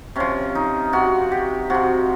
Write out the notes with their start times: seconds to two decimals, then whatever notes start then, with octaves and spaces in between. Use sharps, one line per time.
0.16 C3 F3 C#4
0.55 D#4
0.93 C3 F3 F#4
1.32 G4
1.70 C3 F3 F#4